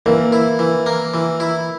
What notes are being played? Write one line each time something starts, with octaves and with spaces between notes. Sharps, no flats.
E3 A#3
E4
E3
A#3
E3
E4